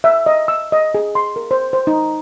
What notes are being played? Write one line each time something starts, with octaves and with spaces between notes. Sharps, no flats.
E5
D#5
E6
D#5
G#4
C6
A#4
C5
C5
D#4